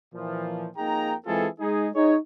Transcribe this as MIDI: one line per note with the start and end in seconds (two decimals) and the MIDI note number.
0.14 0.69 46
0.14 0.69 52
0.14 0.69 53
0.77 1.15 41
0.77 1.15 58
0.77 1.15 63
0.77 1.15 68
0.77 1.15 79
0.77 1.15 82
1.26 1.48 52
1.26 1.48 56
1.26 1.48 60
1.26 1.48 65
1.26 1.48 68
1.26 1.48 69
1.60 1.89 56
1.60 1.89 63
1.60 1.89 68
1.95 2.16 63
1.95 2.16 68
1.95 2.16 73